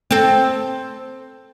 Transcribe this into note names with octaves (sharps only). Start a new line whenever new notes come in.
C4 A4